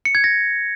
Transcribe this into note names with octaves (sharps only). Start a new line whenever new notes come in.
C#7
G#6
A#6